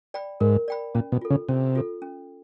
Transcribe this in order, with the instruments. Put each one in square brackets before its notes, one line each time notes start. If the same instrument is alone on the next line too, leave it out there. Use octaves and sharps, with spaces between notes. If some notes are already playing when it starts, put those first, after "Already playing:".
[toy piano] D5 G5 B5
[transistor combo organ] G#2 [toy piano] A#4
[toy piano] D5 G5 B5
[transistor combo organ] A#2 [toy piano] C#4
[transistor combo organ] B2
[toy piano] F4 A4
[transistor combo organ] C#3
[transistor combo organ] C3 [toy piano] C#4
[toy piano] F4 A4
C#4